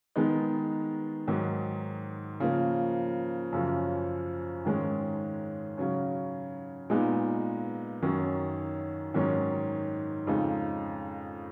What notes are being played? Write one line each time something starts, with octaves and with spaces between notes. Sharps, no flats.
D#3 G#3 B3 D#4
G#2 D#3 F#3
C#3 F3 A#3
F#2 C#3 F3
G#2 D#3 G#3 C#4
C#3 F#3 C#4
A#2 G#3 B3 D#4
F#2 D#3 F#3 C#4
G#2 D#3 F#3 C#4
F2 C#3 G#3 D#4